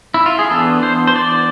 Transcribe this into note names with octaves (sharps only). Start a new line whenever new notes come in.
E4
F4
G#4
E3 B3 D4 A4
C5
C5
D5